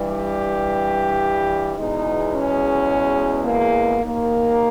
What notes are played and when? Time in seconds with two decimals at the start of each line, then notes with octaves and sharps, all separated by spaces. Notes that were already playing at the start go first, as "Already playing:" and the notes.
Already playing: G2 E3 G3
0.09 G4
1.76 E2 B2 G#3 D#4
2.33 C#4
3.45 A#3
4.01 D#2 D#3 A#3